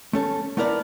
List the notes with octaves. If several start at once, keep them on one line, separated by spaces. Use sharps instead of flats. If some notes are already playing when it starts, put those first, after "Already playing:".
A3 C#4 A4
A3 B3 E4 A#4 C5 D5